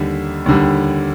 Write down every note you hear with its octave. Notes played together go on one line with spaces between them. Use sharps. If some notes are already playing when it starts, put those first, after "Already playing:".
Already playing: D#2 D3 G3
D#2 D3 G3